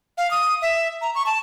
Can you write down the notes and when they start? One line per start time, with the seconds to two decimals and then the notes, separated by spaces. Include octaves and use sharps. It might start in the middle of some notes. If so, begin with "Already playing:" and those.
0.18 F5
0.31 D#6
0.62 E5
1.01 A#5
1.15 C#6
1.26 A5